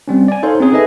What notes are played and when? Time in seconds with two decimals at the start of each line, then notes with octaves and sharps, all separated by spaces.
0.08 G3 C4 C#4
0.28 D5 G#5
0.43 D#4 A4 C5 C#5 F5 C6
0.60 C4 C#4 D#4 G#4 C#5
0.72 G#4 A4 B4 D#5 E5 G#5